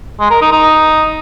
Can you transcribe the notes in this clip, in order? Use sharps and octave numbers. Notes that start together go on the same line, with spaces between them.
G#3
A#4
D#4
D#4